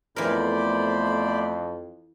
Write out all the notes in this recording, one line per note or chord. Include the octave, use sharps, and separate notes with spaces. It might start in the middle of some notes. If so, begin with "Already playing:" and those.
F2 E3 A3 B3 A#4 C5 D5 B5